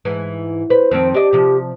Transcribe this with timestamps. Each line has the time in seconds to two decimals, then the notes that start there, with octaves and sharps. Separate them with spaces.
0.05 G#2 E3
0.70 B4 C5
0.91 F2 D#3 C4
1.14 D4 G4 D#5
1.33 C3 F3